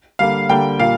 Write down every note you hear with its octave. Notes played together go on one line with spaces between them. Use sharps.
D3 G3 A#3 F5
D3 G3 A#3 G5
A#2 G3 A#3 F5